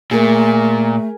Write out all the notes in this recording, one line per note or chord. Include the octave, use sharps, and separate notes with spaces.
A#2 A3 G#4 A#4